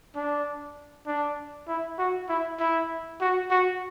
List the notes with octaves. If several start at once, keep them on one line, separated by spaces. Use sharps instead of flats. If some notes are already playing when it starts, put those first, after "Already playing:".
D4
D4
E4
F#4
E4
E4
F#4
F#4